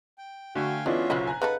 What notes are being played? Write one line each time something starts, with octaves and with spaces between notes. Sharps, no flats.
G5
D3 A3 F#4 F5 G5 G#5
E3 G#3 B3 C#4 D4 F4 F#4 E5
F#1 B1 F#2 B4 C5 D#5
G#5 A#5 F#6
C#3 D#4 A4 B4 F#5